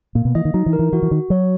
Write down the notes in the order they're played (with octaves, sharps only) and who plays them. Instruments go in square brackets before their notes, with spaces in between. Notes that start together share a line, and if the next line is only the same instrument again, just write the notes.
[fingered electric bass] A#2 [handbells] A#3
[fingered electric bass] B2
[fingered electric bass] E3 [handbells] D#5
[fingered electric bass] D#3
[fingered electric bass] F#3 [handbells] D#4
[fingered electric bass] E3
[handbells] A#4
[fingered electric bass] E3
[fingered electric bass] E3 [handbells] F#4
[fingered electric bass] E3
[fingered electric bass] D#3 [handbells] F#4
[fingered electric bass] F#3 [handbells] C#5